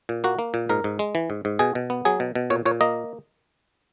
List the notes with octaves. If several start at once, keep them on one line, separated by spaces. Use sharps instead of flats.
A#2
A#3 F#4
A#3
A#2
G#2 A#4
G#2
G#3
E3
G#2
G#2
B2 G#4
B2
B3
F#3 G#4
B2
B2
A#2 C#5
A#2 C#5
A#3 D#5